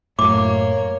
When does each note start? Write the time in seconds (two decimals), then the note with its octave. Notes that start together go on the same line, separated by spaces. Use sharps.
0.19 F#2 A2 A#3 C#5 D6